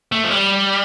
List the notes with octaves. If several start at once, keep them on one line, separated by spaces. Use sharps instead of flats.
A3
F3
G3